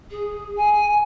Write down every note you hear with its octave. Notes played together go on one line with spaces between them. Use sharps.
G#4
G#5